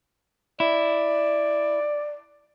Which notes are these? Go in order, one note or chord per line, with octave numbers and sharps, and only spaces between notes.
E4 D5